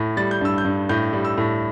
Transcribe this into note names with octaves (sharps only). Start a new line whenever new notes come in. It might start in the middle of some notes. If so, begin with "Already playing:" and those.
Already playing: A2
G3 A6
G6
G2 E6
G6
G2
A2 G6
G3
E6
A2